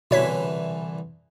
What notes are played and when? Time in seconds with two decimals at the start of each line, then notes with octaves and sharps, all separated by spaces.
0.11 C2 B2 D3 E3 C#5 B6